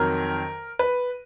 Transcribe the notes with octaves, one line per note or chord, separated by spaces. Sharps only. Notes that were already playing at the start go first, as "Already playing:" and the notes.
Already playing: F2 D#3 F#3 A#4
B4